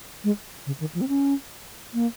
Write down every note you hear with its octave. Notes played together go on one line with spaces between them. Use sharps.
G#3
C#3
D#3
F3
C4
C#4
A#3